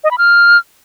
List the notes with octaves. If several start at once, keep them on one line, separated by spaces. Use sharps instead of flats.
D#5
B5
F6